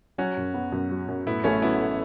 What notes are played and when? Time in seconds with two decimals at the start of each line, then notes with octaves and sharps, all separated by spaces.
0.18 F#3 C#4 F#4
0.37 F#2
0.54 B3
0.72 F#2
0.91 F#3
1.08 F#2
1.27 A2 B3 E4
1.44 A1 A3 C#4
1.62 F#3 B3 E4
1.81 A3